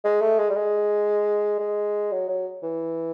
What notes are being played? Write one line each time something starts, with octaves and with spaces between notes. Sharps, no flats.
G#3
A3
G#3
G3
G#3
G#3
F#3
F#3
E3